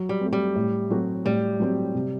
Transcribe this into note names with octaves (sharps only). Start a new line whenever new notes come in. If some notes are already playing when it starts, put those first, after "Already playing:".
Already playing: F#3
G3
A3 C4
G3
A2
F#3 C4 F#4 A4
A2 G3
F#3 C4 G4
C3